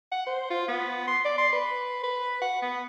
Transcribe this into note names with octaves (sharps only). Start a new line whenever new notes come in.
F#5
C5
F4
B3
C6
D5
C6
B4
B4
F#5
B3